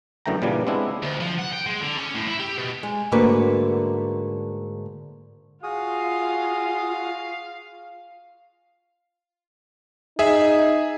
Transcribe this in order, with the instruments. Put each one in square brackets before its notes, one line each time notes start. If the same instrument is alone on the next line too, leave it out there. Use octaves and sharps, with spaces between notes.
[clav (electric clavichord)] F#2 D3 E3 A3 G5 A#5
A#2 C#3 E3 G3 A#3 D4
G#3 B3 C4 D4 E4
[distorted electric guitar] D2
F3
F#5
G5
G#3
D3
C#4
A2
E4
G4
B2
[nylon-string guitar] G#3
G#2 D3 A3 A#3 F#4 B4
[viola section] F4 [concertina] F#4 G#4 D#6 [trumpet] F5
[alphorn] D#4 [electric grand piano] G#4 E5